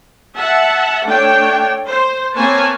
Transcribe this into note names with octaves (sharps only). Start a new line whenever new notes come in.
E5 F#5 A5
A3 D4 C#5 G5
C5
A#3 C4 B4 C#5 G#5 A5